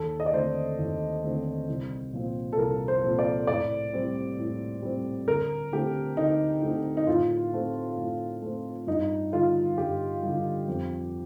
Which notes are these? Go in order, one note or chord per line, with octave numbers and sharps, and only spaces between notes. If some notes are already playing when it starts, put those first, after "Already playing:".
Already playing: D#2 A4
D#5
D5
D3 A3 C4 C5
D#2
D3 A3 C4
C2
A#2 F3 C4
A4
C2 A#4
C5
A#2 F3 C4
D5
A2 D5
G3 C4
A2
G3 C4
D2 A#4
D3 A3 C4 G4
D2 D#4
D3 A3 C4
D#4
A2 F4
A3 C4
A2
A3 C4
G2 D#4
D3 G3 F4
G2 G4
D3 G3
F2